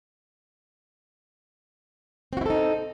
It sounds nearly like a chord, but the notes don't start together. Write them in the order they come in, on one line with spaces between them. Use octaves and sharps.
C4 F#4 E4 A4 D#4